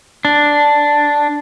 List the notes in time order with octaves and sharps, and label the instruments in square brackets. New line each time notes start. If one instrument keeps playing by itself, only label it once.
[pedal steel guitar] D4